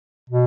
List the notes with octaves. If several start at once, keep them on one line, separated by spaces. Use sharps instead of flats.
B2